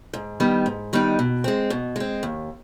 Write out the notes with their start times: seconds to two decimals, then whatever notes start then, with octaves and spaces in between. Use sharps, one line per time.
0.13 G#2
0.40 D#3 G3 B3 D#4
0.66 G#2
0.93 D#3 G3 B3 D#4
1.19 B2
1.44 G#3 C4
1.70 B2
1.96 G#3 C4
2.23 D#2